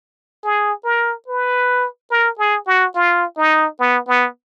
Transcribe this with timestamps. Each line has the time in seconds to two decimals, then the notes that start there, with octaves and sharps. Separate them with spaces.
0.44 G#4
0.85 A#4
1.28 B4
2.11 A#4
2.39 G#4
2.67 F#4
2.95 F4
3.37 D#4
3.79 B3
4.08 B3